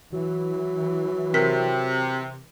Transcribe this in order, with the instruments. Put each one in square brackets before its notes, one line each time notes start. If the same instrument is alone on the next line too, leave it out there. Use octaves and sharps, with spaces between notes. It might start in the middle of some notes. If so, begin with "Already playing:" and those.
[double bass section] E3 [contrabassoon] F#3
[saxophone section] C3 [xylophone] A#4 B6